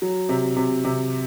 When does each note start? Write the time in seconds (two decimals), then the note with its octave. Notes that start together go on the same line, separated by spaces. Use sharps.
0.02 F#3
0.29 C3
0.56 C3
0.84 C3